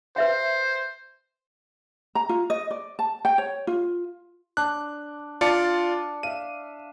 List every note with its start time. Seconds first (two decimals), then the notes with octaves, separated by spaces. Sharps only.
0.16 B4 C5 E5 G5
2.15 A#5
2.29 F4
2.50 D#5
2.71 D5
2.99 A5
3.25 G5
3.38 C#5
3.67 F4
4.57 D4 F#6
5.41 D4 F4 D5 C#7
6.23 E5 F5 D#7